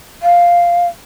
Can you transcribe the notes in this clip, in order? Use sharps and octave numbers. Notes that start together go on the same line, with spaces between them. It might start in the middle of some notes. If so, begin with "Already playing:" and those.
F5